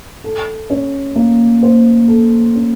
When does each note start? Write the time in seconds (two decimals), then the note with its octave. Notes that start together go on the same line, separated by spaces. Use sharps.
0.24 A4
0.70 C#4
1.16 A#3
1.63 C5
2.08 A4
2.55 C#4